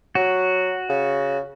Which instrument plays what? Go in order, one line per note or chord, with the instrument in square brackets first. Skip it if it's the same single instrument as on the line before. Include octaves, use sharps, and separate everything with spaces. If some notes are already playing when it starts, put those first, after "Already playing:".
[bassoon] F#3 [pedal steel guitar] F#4
[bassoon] C#3